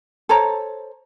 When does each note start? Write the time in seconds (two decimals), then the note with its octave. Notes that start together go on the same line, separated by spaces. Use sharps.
0.29 A4 C5 C#5 A#5